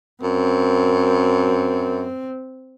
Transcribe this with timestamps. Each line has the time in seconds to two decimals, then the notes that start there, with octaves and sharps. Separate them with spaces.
0.23 F#2 C4